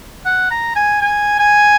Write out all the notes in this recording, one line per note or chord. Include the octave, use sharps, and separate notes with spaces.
F#5
A#5
G#5
G#5
G#5